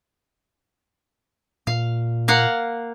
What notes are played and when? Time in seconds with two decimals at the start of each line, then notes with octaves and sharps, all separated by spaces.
1.67 A#2 F5
2.28 A#3 F5 F#5